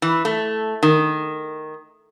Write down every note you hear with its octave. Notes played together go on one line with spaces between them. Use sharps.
E3
A3
D#3